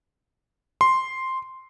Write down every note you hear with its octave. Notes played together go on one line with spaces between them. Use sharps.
C6